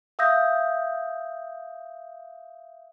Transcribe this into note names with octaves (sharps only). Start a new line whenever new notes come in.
E5 F5 D#6 E6 G6 A#6